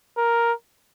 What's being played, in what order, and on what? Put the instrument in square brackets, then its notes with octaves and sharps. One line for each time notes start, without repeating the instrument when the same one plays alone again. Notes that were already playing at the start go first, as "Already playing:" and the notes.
[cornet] A#4